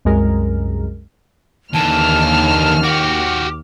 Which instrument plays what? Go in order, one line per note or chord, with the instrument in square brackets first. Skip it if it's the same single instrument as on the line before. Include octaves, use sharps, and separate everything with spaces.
[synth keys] C2 F#2 G#3 A#4
[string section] D#2 F6 [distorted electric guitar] D3 E3 [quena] A5
[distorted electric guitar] F#4 G4 [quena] D6